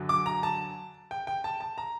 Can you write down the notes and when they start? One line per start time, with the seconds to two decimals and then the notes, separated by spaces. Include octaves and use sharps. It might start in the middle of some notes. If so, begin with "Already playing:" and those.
Already playing: F#2 D3 F#3
0.09 D6
0.26 A#5
0.43 A5
1.11 G5
1.27 G5
1.44 A5
1.60 A5
1.78 A#5